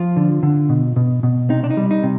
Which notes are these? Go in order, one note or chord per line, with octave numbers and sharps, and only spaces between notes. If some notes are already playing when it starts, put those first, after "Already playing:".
Already playing: F3 F4
D3
D3
B2
B2
B2
C3 D#4
D4
D#4
G3
D#4
C3